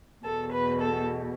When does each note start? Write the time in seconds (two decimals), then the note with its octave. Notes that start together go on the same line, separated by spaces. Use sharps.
0.24 E2 B2 A4
0.52 B4
0.81 A4